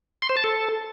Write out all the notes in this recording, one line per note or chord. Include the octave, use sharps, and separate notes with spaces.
C6
C5
A5
A4